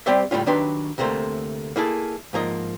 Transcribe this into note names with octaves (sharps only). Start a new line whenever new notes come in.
G3 C4 G4 C5 D5 E5
C#2 A2 G3 A#3 C#4 F4
D#3 F#3 D4 G4 B4 C6
D2 C3 A3 A#3 C5
A#3 E4 G#4 A4
G#2 F3 A#3 D#5